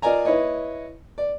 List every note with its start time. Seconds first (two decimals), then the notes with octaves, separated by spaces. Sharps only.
0.02 F4 A#4 D5 D#5 G#5 A#5
0.25 E4 B4 C#5 D#5
1.18 D5